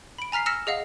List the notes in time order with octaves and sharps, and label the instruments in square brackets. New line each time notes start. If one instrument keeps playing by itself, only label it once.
[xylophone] B5 D7
G#5 A#5 F6 B6 C7
E6 F6 A#6 B6 C#7 E7
G#4 D#5 F5 F#5